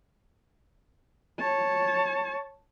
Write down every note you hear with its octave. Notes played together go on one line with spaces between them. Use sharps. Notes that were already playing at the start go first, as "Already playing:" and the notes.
C#5 A5